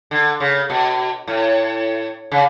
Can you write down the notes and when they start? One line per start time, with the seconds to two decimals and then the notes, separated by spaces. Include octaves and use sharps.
0.11 D3
0.40 C#3
0.70 B2
1.27 A2
2.32 C#3